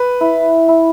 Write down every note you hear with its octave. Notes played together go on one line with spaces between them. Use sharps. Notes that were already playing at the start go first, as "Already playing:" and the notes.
Already playing: B4
E4
E4